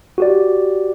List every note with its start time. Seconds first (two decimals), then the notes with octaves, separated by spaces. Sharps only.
0.18 F#4 G4 D5